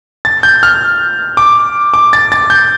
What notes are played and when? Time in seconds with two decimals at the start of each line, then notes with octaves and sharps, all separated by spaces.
0.25 A6
0.43 G6
0.63 F6
1.37 D6
1.94 D6
2.13 A6
2.32 A6
2.50 G6